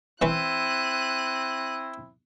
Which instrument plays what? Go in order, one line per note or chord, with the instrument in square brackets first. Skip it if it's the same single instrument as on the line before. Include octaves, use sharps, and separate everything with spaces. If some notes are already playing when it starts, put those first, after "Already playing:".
[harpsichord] E3 C#4 B4 [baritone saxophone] C4 [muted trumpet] E4 [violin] F#6 D#7